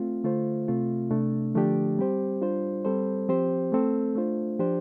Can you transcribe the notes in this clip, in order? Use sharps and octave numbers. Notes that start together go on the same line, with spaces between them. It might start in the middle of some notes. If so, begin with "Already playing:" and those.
Already playing: A3 C4 F4
D3 A3 F4 C5
C3 A3 C4 F4
C3 A3 D4
D3 F3 A3 D4 G4
G3 C4 G4 C5
G3 D4 F4 C5
G3 C4 A4 C5
F3 C4 G4 C5
A3 C4 A4
A3 D4 F4 C5
F3 D4 G4 C5